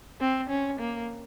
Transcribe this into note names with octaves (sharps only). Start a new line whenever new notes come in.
C4
C#4
A#3